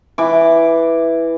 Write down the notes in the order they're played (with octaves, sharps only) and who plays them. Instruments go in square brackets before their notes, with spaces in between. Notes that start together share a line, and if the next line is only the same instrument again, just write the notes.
[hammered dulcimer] E3 D6